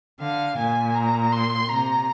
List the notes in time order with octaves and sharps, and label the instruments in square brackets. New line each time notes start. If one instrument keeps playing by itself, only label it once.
[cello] D3 [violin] F5
[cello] A#2 [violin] G#5
[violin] A#5
C6
[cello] C3 [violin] A#5